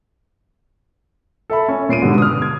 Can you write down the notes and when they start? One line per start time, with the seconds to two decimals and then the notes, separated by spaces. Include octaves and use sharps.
1.50 A4 E5 B5
1.68 C#4
1.89 A#2 C7 D7 D#7
2.02 G#2 B2 D3 G3
2.18 D#6 F6
2.42 G#6